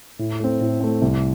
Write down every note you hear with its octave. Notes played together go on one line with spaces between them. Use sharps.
A2
A3 C4
A2
A3 C4
C2